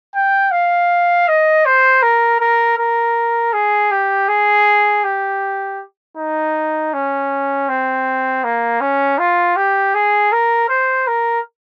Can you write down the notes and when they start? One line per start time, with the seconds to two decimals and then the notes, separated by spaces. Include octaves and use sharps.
0.15 G5
0.51 F5
1.28 D#5
1.66 C5
2.02 A#4
2.40 A#4
2.78 A#4
3.53 G#4
3.91 G4
4.28 G#4
5.04 G4
6.17 D#4
6.93 C#4
7.68 C4
8.44 A#3
8.81 C#4
9.18 F4
9.56 G4
9.94 G#4
10.32 A#4
10.69 C5
11.07 A#4